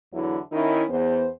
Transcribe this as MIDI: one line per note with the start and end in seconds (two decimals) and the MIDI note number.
0.13 0.37 40
0.13 0.37 50
0.13 0.37 54
0.13 0.37 64
0.52 0.83 51
0.52 0.83 61
0.52 0.83 63
0.52 0.83 64
0.89 1.27 40
0.89 1.27 59
0.89 1.27 72